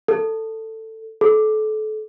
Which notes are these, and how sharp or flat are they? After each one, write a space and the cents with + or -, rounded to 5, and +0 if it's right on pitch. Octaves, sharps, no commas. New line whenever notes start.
A4 +15
A4 -30